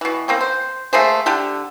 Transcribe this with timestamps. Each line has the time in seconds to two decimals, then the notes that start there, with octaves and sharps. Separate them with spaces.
0.01 B2 E3
0.28 A#3 C4 C#4
0.41 C5
0.93 A3 A#3 G#4 C5
1.26 D3 G4 A4